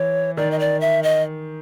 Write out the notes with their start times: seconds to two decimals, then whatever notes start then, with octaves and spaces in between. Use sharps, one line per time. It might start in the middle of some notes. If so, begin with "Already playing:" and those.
Already playing: E3 C#5
0.37 D#3 D5
0.51 D#5
0.59 D5
0.81 E5
1.03 D#5